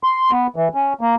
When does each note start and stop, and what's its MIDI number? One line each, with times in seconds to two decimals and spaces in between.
0.03 0.31 84
0.31 0.47 59
0.56 0.68 52
0.75 0.93 61
1.01 1.15 58